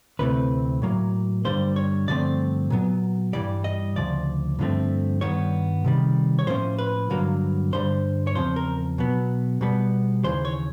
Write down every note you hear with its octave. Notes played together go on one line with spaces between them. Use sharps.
D2 C3 E3 A3 C4 B4
A2 F#3 A#3
G2 D3 G3 A#3 C5
C#5
G2 D3 F3 A3 C4 D5
A#2 F#3 B3
G2 E3 G3 D5
D#5
D2 C#3 F3 D5
G2 D3 F3 A3 C4
G2 D#3 G3 B3 C#5
C3 D#3 G3
C#5
A2 F3 A#3 C#4 C5
B4
G2 D3 F#3 A#3
G2 D3 G3 C5
C#5
E2 C#3 F3 C4 C5
A#4
B2 F#3 B3
B2 G3 B3
D#2 C#3 E3 C5
C#5